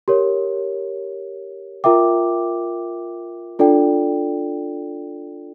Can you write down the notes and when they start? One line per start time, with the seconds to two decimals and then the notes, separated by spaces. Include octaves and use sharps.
0.08 G4 A#4 C#5
1.84 F4 A#4 E5 G5 D6
3.59 D4 F4 A4 D5 G5